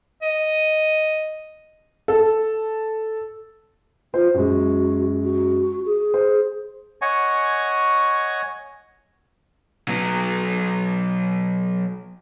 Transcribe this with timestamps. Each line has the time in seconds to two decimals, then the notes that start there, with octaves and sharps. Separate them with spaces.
0.23 D#5
2.08 A4
4.14 F4 C5
4.34 F#2 G#3 F#4
5.24 F#4
5.85 G#4
6.14 C5
7.02 C#5 D#5 F#5 G#5 C#6
9.88 F#3 B3